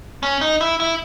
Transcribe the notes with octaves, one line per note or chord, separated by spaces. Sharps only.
C#4
D#4
E4
E4